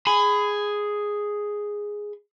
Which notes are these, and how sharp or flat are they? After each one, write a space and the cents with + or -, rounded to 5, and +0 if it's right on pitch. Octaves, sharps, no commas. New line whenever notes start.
G#4 +0 B5 +25